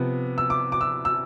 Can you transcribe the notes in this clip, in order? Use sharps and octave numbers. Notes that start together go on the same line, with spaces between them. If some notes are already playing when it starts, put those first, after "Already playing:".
Already playing: C3 F3 B3
E6
D6
D6
E6
E6